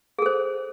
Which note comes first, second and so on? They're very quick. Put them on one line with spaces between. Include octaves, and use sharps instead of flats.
G#4 A4 C5